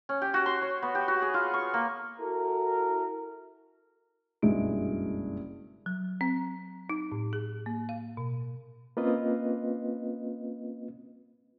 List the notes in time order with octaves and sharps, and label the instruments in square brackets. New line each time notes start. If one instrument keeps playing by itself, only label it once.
[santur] C#4
G4
F#4
C6
C#5
B3
G4
F#4
G#4
F4
C#6
A#3
[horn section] E4 F#4 A4 A#4
[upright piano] F#1 B1 G2 G#3 E4 D7
[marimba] F#3
C4
D#4
A2
G#4
A#3
F5
B2
[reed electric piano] A#3 C4 C#4 F4 B4 D#5